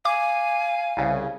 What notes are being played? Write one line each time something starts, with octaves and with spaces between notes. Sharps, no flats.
F5 G#5 D6
C2 C#3